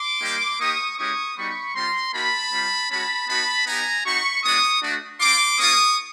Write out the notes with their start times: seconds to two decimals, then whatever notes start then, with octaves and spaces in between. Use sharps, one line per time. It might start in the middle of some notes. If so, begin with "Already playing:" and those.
Already playing: C6 D6
0.22 G3 A#3 D#4 G4
0.59 A#3 D#4 G4 C#6 D#6
0.98 G#3 C#4 E4 G4 C#6 D#6
1.37 G3 B3 D#4 F#4 B5 C#6
1.74 G3 C4 F4 A#5 C6
2.13 A#3 D#4 F#4 A5 B5
2.52 G3 C4 F4
2.90 G#3 C#4 F#4 A5 B5
3.28 B3 D#4 F#4 A5 B5
3.66 B3 D#4 G4 G#5 A#5
4.05 C4 D#4 F#4 B5 C#6
4.43 G#3 B3 D4 F#4 C#6 D#6
4.82 A3 D4 F#4
5.20 C4 F4 C6 D6
5.58 A#3 C#4 F4 C#6 D#6